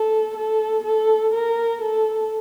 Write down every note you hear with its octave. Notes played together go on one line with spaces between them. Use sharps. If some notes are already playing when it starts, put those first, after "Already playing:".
Already playing: A4
A4
A4
A#4
A4